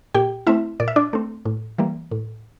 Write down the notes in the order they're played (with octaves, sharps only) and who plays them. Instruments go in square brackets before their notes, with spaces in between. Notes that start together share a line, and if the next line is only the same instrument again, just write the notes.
[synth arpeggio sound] A#2 G4 G5
A3 C4 E4 E5
A#2 D5
E5
D4 D5
A3 C4
A2
E3 G3 A#3
A2